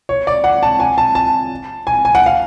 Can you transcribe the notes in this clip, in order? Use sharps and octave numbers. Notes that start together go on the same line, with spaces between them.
C#5
D5
F#5
A5
G#5
A5
A5
G#5
G#5
F#5
F5